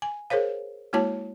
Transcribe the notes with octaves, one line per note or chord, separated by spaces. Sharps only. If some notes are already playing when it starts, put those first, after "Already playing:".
G#5
G#4 A#4 C5 C#5 F5
G#3 A#3 E4 F#4 C#5 A5